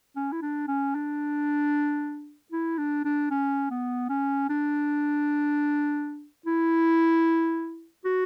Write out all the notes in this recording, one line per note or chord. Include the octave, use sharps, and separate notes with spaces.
C#4
E4
D4
C#4
D4
E4
D4
D4
C#4
B3
C#4
D4
E4
F#4